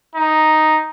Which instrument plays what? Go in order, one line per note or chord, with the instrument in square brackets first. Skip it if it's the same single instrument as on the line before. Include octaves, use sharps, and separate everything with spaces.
[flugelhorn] D#4